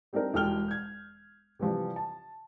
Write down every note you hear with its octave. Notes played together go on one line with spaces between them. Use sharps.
G3 C4 D4 D#4 A#4
E1 G3 A4 G5 F6 G7
G6 G#6
C3 E3 F3 G3
A5